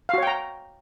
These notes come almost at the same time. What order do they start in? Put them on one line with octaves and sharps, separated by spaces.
F5 F#4 C#5 G5 A#5